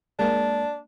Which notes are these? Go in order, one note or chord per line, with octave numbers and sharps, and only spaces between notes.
G#3 A#3 D4